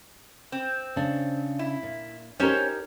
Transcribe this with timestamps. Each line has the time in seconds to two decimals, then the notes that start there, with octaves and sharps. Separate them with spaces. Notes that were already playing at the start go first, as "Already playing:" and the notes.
0.52 C4
0.96 C#3 D4
1.59 E4
1.83 A#2
2.40 C#4 D#4 G4 A#4 C5 C#5